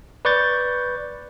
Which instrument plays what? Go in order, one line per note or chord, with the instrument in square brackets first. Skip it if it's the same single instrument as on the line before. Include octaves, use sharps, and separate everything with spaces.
[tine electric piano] B4 D5 C#6 G6 A6